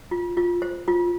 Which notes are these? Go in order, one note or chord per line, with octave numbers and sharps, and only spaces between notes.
F4
F4
C5
F4